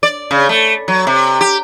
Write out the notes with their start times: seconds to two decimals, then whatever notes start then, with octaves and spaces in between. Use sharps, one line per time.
0.03 D5
0.31 C#3
0.49 A3
0.88 F#3
1.07 C3
1.41 G4